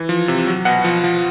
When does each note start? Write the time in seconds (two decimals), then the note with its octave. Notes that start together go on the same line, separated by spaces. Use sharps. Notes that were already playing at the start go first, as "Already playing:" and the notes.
Already playing: E3
0.09 F3
0.28 C3
0.47 F#3
0.65 B2 F#5
0.84 F3
1.04 F3